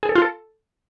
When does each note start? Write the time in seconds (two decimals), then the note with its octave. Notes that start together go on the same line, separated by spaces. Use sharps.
0.03 G#4
0.09 A4
0.15 F4
0.22 A4